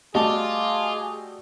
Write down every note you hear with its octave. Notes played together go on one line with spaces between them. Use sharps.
G3 A3 F4 F#4 G#4 D#5 A5 D6